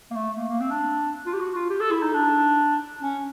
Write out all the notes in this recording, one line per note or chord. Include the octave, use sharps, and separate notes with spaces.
A#3
A3
A#3
A#3
C4
D4
F4
G4
F#4
F4
G4
A4
E4
D#4
D4
C#4